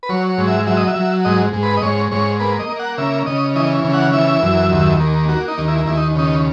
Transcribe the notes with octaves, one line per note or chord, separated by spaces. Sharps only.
B4
F#3 C#5
C#5
G#2
E5
F#3 E5
D#5
E5
F#3
G#2 D#5
G#2
B4
D#5
G#2 C#5
G#2 C#5
A#3 B4
D#5
A#3
F#5
C#3 E5
C#3 D#5
E3 D#5
C#3
F#5
E3 E5
F#2
D#2
A#3
A#3 F#4
D#4
D#2
E4
D#2 E4
D#4
C#3 D#4